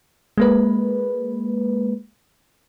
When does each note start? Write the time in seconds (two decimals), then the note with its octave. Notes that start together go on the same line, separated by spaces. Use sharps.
0.38 G#3 A#3 B4